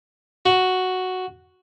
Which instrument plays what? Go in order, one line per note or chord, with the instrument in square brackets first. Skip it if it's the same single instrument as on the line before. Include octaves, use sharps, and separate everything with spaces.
[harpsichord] F#4